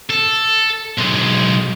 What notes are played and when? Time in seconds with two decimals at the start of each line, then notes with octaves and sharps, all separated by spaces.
0.10 A4
0.98 B1 G#3